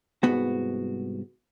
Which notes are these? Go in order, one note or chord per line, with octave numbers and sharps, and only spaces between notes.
C2 G#2 B3 F#4